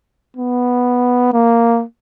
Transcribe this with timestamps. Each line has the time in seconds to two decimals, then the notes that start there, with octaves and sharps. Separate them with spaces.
0.37 B3
1.33 A#3